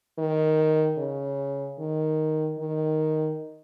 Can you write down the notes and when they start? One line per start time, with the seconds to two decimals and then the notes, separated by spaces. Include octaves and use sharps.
0.19 D#3
0.98 C#3
1.79 D#3
2.59 D#3